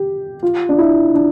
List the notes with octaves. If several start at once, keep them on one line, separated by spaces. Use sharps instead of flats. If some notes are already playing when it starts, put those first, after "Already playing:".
Already playing: G4
F4
D4
E4
D4